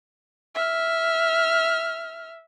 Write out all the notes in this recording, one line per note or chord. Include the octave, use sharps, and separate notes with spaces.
E5 F6